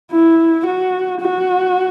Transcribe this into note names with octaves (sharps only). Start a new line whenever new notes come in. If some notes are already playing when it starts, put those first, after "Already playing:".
E4
F#4
F#4